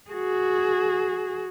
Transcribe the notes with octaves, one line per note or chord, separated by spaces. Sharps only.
F#4 G#4